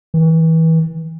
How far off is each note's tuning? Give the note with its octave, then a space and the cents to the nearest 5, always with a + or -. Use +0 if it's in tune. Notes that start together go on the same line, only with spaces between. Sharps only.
E3 -30